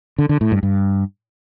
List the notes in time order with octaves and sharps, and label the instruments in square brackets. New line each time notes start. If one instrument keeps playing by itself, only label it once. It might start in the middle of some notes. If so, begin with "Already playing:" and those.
[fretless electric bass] D3
D3
A2
G2
G2